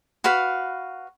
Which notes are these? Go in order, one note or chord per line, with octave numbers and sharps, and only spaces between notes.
F#4 B4 F5 B5